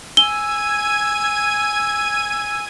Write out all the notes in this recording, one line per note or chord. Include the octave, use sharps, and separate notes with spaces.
G#5 E6 G#6 D#7 G7